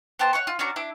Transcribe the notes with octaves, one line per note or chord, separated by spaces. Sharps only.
B3 G4 C5 A5
C#5 F5 F#5 C#6
F4
C#4 D4 F#4 A#5
D4 E4 D6